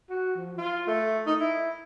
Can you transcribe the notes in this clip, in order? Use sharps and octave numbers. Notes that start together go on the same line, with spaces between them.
F#4
F3
F4
A3
D#4
E4